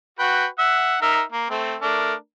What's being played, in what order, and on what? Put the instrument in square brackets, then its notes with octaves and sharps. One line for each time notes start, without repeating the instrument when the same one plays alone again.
[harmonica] F#4 B4 G5
E5 F#5
D#4 A#4 E5
A#3
A3 C4
A3 D4 A#4